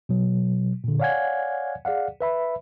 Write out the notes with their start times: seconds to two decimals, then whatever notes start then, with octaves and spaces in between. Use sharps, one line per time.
0.09 B2 F#3
0.84 A#2 D3
1.00 C#5 D5 F5 F#5 G#5 G#6
1.85 G#4 D5 F5 F#5
2.21 B4 E5 B5